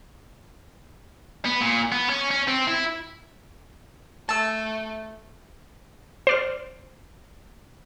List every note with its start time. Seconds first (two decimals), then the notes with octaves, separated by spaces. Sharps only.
1.45 B3
1.61 A#2
1.92 B3
2.10 C#4
2.31 C#4
2.48 C4
2.68 E4
4.29 A3 A5 E6
6.27 C5 D5 F6